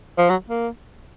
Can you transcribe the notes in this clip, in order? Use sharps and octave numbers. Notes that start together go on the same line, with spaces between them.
F3
F#3
A#3